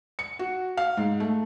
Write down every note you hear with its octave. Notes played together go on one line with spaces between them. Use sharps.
C#7
F#4
F5
G#2
A3